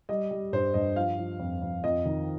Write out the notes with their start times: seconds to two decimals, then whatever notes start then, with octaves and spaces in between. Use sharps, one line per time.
0.09 G3 D#5
0.31 G3
0.53 G2 C5
0.74 G2 D#5
0.96 F3 F5
1.18 F3
1.40 F2
1.62 F2
1.83 F2 D#5
2.05 D#3